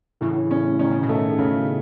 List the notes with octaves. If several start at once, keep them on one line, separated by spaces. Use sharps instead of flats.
A2 C#3 E3
C#4
D#3 C#4
C#3
B2 D#3
A3
C#3